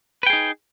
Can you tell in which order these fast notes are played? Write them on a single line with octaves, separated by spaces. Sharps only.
B4 G5 G#4 D#4